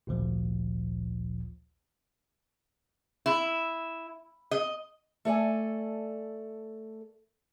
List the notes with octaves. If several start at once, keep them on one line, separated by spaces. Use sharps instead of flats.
G#1 D2 A#2 F3
E4
D#5
A3 A4 D5 G#5